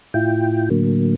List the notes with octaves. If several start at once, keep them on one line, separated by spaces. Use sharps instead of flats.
A2 E4 F4 G5
A2 D3 F#3 A#3